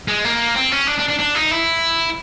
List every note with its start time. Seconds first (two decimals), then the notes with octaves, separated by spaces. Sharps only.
0.08 G#3
0.25 A#3
0.56 C4
0.72 C#4
0.88 D4
0.99 D4
1.09 D4
1.19 D4
1.36 D#4
1.51 E4